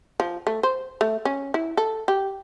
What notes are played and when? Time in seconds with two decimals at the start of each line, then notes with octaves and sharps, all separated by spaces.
0.20 F3
0.47 A3
0.63 C5
1.01 A3
1.25 C#4
1.54 E4
1.77 A4
2.08 G4